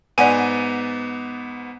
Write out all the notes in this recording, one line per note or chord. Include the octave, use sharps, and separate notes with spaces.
G#2 B3 D5 F#5 G#5 D#7